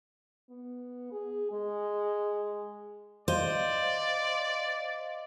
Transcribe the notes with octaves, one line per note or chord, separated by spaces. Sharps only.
B3
G#4
G#3
C5 D5 D#5 F5